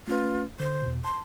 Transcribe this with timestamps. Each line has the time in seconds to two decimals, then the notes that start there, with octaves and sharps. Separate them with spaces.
0.07 A3 C#4 F4 B4
0.60 D3 C5
0.82 E2 B2
1.04 A5 C6